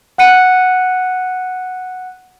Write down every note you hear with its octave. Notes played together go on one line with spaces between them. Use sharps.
F#5 F#6 C#7 D#7